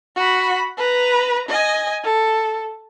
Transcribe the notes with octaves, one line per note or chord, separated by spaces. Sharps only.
F#4 B5
B4 A#5
D#5 G#5
A4